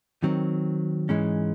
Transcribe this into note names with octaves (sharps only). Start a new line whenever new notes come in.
D#3 F#3 C4
G#2 E3 G#3 C#4